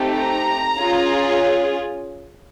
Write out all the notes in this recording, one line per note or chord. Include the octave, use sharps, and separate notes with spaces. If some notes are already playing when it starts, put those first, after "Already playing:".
Already playing: A3 C4 D#4 G4
A#5
C#4 F4 G#4